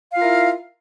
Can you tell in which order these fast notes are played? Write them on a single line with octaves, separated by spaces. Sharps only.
F5 F4 A#4 E4